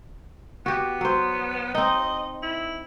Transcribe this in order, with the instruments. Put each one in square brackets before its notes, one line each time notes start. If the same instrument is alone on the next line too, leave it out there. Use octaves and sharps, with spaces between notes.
[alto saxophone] B3 [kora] F#4 G4
[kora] F#3 C5
[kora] C4 D#4 [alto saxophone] D#5
[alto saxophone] E4